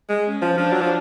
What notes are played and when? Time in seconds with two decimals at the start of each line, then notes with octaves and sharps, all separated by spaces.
0.09 G#3
0.25 C#4
0.42 F3
0.57 F3 D4
0.72 F#3
0.81 F3